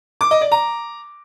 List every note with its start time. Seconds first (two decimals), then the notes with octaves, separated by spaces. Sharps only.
0.21 D6
0.31 D#5
0.41 D5
0.52 A#5